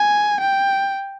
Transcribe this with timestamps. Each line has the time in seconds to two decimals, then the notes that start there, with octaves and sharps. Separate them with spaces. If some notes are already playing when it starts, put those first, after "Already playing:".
Already playing: G#5
0.41 G5